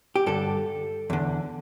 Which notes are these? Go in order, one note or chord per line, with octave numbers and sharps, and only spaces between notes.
G4
G2 D3 A4
E2 D3